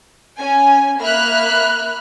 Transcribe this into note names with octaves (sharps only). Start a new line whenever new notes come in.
C#4 G#5
A#3 E5 B5 F6 F#6